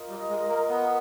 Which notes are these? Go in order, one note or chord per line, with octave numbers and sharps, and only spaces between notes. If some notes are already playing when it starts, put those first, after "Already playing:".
Already playing: F4 A#4 D#5
G3
G#3
A#3
B3